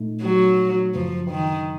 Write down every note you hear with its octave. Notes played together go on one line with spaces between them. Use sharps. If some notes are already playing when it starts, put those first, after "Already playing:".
Already playing: A#2 A3 D#4
F#3
F#2 C#3 F3 F#3
D#3